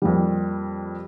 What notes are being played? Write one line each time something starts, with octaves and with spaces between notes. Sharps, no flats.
F2 A#2 G3